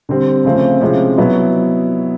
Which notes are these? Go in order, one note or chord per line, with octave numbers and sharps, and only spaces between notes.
D3 G3 C4
C#3 F3 A3 C4
C3 F3 G#3 C#4 E4
B2 F#3 B3 E4